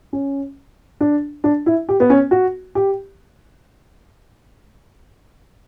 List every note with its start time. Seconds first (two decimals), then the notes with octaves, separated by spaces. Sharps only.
0.13 C#4
1.01 D4
1.44 D4
1.66 E4
1.89 G4
2.00 B3
2.10 C#4
2.31 F#4
2.75 G4